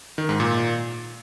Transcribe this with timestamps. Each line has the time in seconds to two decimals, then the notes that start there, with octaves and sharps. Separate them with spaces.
0.18 D#3
0.29 G#2
0.40 A#2